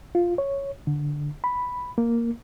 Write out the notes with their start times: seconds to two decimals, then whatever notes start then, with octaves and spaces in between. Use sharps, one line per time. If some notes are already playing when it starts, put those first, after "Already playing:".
0.15 F4
0.38 C#5
0.87 D3
1.44 B5
1.98 A#3